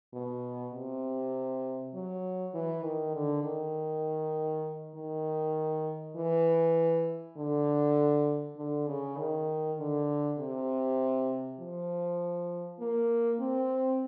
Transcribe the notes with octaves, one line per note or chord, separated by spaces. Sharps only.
B2
C3
F#3
E3
D#3
D3
D#3
D#3
E3
D3
D3
C#3
D#3
D3
C3
F3
A#3
C4